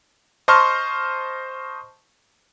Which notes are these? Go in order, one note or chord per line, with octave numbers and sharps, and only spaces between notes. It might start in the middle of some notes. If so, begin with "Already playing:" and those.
C5 D#5 A5 C6 C#6 F6